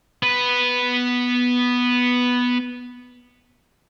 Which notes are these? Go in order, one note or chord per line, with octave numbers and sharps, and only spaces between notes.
B3